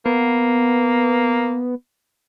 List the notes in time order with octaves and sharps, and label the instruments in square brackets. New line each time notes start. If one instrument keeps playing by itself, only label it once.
[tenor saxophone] A#3 [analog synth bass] B3